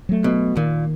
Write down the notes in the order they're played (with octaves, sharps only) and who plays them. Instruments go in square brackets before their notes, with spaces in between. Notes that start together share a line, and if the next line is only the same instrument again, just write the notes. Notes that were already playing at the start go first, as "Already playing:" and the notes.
[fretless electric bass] F#3 A3
[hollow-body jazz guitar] B2
[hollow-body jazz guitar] A#2 [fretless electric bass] D#3